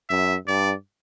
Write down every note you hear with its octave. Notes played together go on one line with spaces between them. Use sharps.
F#2 E5
G2 D5